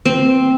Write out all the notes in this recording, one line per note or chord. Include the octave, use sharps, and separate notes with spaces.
C4